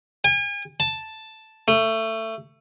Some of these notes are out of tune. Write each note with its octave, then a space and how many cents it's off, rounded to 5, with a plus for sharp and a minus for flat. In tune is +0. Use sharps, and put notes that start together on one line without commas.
G#5 -40
A5 +0
A3 +20